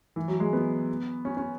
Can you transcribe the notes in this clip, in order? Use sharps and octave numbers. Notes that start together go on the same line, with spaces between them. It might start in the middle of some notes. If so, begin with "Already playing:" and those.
E3
F#3
G#3
B3
C#4
C#4